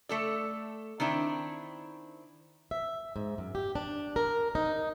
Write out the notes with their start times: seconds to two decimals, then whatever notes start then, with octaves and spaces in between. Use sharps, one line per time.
0.09 A3 A4 D5
1.00 D#3 C4 D4 E4
2.71 E5
3.16 G#2
3.38 F#2
3.55 G4
3.75 D4
4.16 A#4
4.55 D#4